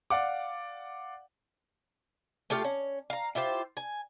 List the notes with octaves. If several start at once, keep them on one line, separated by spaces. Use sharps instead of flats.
D5 F5 F#5 D6
A3 F4 G4 F5
C#4
F5 A#5
E4 F4 G4 C5
G#5